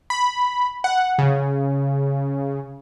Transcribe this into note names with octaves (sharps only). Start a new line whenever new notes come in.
B5
F#5
C#3